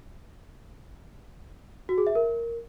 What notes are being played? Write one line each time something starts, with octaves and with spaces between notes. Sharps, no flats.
F#4
G#4
E5
A#4